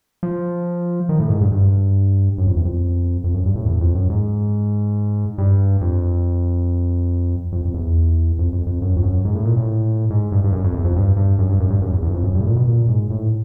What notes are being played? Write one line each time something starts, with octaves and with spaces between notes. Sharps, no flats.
F3
D#3
A2
G#2
G2
G2
F#2
F2
E2
F2
F2
F#2
G2
A2
E2
F2
F#2
G#2
G2
F2
F2
F2
E2
F2
F2
F2
F#2
F2
F#2
G#2
A2
A#2
A2
G#2
G2
G2
F#2
F2
E2
F2
G2
G2
F#2
G2
F#2
G2
F#2
E2
E2
F#2
F2
F#2
G2
A2
A#2
B2
A#2
G#2
A2